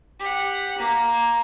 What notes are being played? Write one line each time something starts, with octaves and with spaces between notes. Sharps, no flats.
G4 F#5
A#3